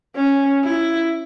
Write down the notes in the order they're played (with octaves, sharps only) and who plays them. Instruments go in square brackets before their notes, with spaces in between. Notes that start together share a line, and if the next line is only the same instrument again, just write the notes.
[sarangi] C#4
E4